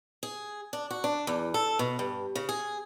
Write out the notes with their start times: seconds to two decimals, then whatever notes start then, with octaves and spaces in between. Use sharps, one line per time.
0.23 G#4
0.73 D4
0.91 F#4
1.04 D4
1.27 E2
1.54 A4
1.79 B2
1.99 G2
2.36 C#3
2.49 G#4